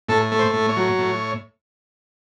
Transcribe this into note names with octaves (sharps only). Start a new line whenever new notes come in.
A2 A4
A3
C5
A2
C#5
F#3
A2